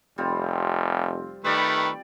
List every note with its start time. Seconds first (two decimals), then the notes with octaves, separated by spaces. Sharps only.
0.18 F1 G3 C4 F4
1.44 D#3 G3 A3 B4 D5